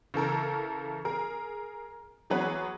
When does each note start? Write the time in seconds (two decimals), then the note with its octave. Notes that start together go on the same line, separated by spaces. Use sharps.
0.14 C#3 E3 A4 A#4
1.05 G#4 A#4
2.30 E3 F#3 B3 G#4 B4 C#5